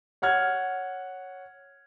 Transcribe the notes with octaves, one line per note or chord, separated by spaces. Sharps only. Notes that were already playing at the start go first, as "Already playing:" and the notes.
C#5 F#5 F6 G#6